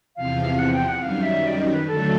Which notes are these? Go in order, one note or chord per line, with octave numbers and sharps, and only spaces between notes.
E2 C3 F3 F5
F#5
G5
F#5
F#2 D#3 G3 F5
E5
D5
D#5
B4
D3 F#3 A3 A4